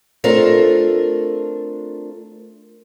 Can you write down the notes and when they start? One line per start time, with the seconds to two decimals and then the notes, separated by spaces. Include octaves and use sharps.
0.24 A3 C4 D4 F4 A4 A#4